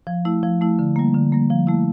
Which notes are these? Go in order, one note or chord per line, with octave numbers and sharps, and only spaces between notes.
F3
A3 E4
F3
A3 E4
D3
G3 A#3
D3
G3 A#3
F3
A3 E4